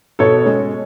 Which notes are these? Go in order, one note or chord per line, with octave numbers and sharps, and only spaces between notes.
B2 A4 C#5
G#3 C#4